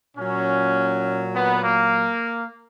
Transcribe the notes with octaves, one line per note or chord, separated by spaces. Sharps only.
A#2 F#3 C#4
B3
A#3